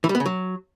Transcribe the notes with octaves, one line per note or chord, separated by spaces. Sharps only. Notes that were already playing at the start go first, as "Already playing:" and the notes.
E3
G3
B3
C#3
F#3